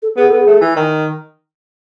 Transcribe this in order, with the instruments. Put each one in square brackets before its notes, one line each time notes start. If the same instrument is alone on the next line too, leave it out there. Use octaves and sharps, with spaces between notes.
[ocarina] A4
[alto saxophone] B3 [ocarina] G#4
[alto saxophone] B3 [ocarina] A4
[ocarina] G#4
[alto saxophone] A3
E3
D#3